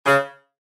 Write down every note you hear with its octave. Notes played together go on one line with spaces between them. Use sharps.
C#3